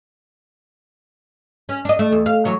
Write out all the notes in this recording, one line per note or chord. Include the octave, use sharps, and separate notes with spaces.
C#4
D4 D#5
A3
E2
F5
E3 F#3 C#5